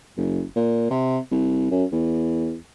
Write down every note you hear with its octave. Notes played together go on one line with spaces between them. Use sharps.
F#1
A#2
C3
C2
F#2
E2